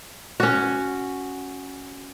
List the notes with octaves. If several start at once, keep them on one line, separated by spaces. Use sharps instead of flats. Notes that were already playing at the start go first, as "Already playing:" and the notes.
C#4 F#4